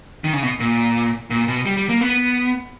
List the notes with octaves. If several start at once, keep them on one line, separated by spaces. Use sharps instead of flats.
D#3
C#3
B2
A#2
A#2
B2
G3
G3
A#3
B3